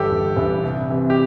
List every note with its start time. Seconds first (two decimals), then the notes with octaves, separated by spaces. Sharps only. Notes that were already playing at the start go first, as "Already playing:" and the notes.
Already playing: G1 G2 E3 G4 A4
0.11 G1
0.37 G2 E3
0.64 C2
0.90 C3 E3
1.10 G4